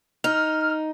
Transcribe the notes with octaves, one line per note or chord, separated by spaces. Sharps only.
D#4 F6